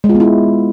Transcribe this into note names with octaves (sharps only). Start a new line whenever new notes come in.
G#3
F4
B3
E4